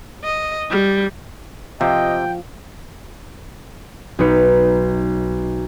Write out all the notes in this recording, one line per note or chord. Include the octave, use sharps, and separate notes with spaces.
D#5
G3
C3 F3 D#5 G5
B1 D#4 B4 C#7